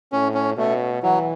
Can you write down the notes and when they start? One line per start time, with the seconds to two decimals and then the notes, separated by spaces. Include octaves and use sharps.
0.12 A2 C#4
0.34 C#4
0.57 B2 A3
1.03 E3 F#3